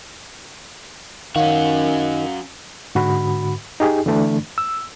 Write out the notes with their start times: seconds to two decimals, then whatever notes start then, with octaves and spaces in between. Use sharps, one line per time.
1.36 D#3 C#4 F#4 F5
2.95 G#2 D3 F#4 B5
3.80 D#4 G4 G#4
4.06 D3 E3 A3 D4
4.58 E6